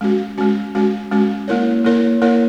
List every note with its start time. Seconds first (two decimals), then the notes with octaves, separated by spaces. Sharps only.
0.01 G#3 C#4 F#4
0.38 G#3 C#4 F#4
0.75 G#3 C#4 F#4
1.11 G#3 C#4 F#4
1.48 A#3 E4 A#4 C#5
1.85 A#3 E4 A#4 C#5
2.22 A#3 E4 A#4 C#5